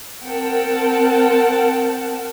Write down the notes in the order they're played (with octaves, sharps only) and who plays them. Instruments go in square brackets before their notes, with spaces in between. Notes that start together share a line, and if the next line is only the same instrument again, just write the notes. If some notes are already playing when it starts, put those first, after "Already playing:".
[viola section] C4 A#4 F#5 G5 A5